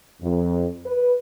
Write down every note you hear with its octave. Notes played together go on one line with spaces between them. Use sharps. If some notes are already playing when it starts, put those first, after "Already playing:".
F2
B4